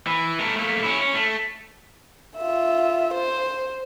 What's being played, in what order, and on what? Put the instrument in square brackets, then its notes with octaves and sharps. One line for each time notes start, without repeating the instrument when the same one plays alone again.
[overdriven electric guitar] E3
A3 A#4
A3 A#3
C#4 E4
C#4
A3
[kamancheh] F4 E5
C5